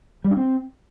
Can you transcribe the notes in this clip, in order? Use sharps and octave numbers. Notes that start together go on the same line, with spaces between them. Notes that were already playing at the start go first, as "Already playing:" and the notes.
G3
D4
C4